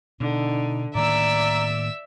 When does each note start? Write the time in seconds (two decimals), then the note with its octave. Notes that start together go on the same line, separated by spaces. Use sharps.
0.20 B2 D3 D#4
0.95 A2 D#3 A#3 D5 E5 A#5 E6